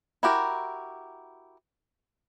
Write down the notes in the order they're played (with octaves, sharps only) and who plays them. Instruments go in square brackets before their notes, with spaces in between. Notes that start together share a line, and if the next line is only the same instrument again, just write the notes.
[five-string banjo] E4 F#4 G4 A#4